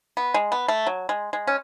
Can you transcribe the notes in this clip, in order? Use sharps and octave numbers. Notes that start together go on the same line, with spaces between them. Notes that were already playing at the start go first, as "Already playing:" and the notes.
B3
G#3
B3
A3
F#3
G#3
G#3
C#4